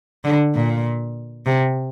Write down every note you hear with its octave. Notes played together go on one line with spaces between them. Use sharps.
D3
A#2
C3